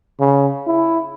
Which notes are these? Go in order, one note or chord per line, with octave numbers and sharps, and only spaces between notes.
C#3
E4